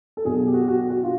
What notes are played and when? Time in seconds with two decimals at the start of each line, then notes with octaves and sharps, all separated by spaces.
0.17 A4
0.25 B2 F#3 G#4
0.47 G4
0.54 F#4
0.61 G4
0.68 F#4
0.90 F#4
1.03 F4